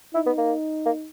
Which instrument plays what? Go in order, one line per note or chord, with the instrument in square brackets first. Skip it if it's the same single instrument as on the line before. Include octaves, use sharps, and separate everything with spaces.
[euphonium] D#4 [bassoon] E4
[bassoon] B3
A#3
A#3